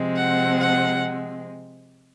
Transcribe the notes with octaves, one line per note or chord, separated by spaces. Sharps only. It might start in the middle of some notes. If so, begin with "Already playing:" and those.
Already playing: C3 F3 G#3 C4
F#5
F#5